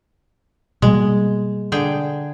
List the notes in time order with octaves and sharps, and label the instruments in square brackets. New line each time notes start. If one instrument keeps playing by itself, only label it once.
[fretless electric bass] B2 G3 A#3 [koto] G#3
[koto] D3 G#4 G5